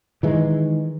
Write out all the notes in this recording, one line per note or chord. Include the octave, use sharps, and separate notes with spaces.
D#3 E3 G#3